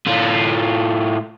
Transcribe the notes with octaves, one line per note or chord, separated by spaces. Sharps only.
A2 F4